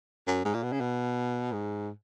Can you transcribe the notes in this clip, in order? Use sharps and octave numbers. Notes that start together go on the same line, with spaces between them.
F#2
G#2
A#2
B2
C#3
B2
G#2